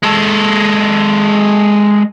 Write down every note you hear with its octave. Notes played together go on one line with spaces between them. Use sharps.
G#3 A4